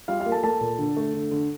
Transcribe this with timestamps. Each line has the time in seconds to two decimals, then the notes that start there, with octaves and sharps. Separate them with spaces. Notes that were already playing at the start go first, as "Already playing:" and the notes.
0.08 G3 F4 F5
0.20 F4 F5
0.26 A#3
0.32 A4 A5
0.43 A#3 A4 A5
0.61 A#2
0.79 D3
0.97 A3
1.14 D3
1.31 D3